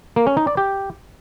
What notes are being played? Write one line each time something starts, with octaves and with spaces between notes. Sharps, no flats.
A#3
C#4
D#4
D5
G4